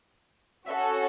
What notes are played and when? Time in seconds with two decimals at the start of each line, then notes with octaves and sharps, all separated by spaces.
0.67 C#4 F#4 A4 E5